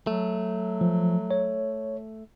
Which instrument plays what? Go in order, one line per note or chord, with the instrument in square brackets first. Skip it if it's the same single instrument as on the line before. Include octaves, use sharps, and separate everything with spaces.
[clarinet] F#3 [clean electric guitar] A3
[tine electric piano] F3
C#5